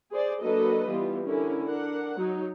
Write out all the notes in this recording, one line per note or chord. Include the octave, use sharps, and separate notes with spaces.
G#4 C5 D5
F#3 A#3 D4 A4 B4 D#5
E3 G3 B3 F4
D3 C#4 E4 A#4
D4 A#4 F#5
F#3 D#4 C#5